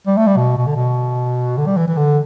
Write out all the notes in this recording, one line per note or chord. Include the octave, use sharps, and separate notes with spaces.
G3
A3
G3
B2
B2
D3
B2
D3
G3
E3
E3
D3